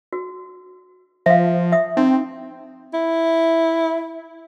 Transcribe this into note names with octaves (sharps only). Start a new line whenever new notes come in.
F#4
F3 E5 F5
E5 D#6
C4 D#4
E4